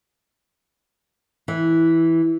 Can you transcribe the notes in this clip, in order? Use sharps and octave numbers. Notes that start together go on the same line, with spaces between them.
E3